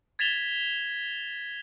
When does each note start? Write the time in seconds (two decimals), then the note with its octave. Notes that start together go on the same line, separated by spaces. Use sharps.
0.19 G#6 A6 B6 E7 F7 G7